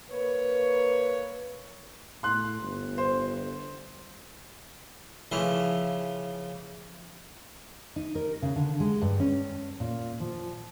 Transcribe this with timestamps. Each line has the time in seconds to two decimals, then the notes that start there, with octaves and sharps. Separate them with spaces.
0.11 A#3 B4 C#5
2.23 A2 C6 F#6
2.62 G1
2.98 C5
5.32 C#3 E3 F3 E4
7.96 D#4
8.15 A#4
8.42 C#3
8.56 D3
8.80 G#3
9.02 G2
9.20 C#4
9.80 A#2
10.20 F3